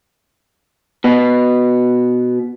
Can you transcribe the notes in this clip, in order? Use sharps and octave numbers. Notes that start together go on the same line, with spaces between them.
B2 B3